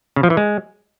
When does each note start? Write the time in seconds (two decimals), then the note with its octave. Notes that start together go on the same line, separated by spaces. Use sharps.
0.16 C#3
0.23 F3
0.30 E3
0.37 G#3